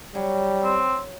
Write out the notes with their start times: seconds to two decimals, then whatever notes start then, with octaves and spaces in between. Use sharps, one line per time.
0.15 F#3 G3
0.64 C4